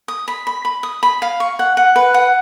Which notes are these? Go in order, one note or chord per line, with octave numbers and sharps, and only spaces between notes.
D#6
B5
B5
B5
D#6
B5
F5
C#6
F#5
F#5
B4
F#5